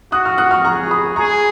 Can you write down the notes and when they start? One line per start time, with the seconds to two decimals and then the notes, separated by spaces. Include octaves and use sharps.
0.12 F#4 D#6 F#6
0.25 C#6 F6
0.38 D#6 F#6
0.51 C#6 F6
0.65 G#4 A#5 C#6
0.91 B5 D#6
1.16 G#4 A#5 C#6